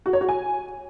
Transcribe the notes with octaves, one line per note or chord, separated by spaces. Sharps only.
F#4
C#5
F#4
G#5